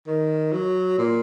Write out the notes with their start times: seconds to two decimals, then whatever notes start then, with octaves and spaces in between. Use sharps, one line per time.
0.07 D#3
0.52 F#3
0.99 A#2